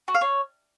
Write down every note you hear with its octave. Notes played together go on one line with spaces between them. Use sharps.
F#4
F5
C#5